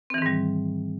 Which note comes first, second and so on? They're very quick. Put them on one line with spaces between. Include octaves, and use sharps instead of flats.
C4 E3 D#3 G#2 G3